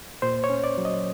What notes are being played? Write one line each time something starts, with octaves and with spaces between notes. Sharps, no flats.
A#2 C5
C#5
C#4
D5
F#3
D#5